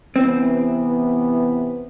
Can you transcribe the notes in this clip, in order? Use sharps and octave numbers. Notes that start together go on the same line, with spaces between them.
C3 E3 B3 C4